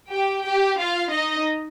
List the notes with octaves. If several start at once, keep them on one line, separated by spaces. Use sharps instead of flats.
G4 G5
G4 G5
F4 F5
D#4 D#5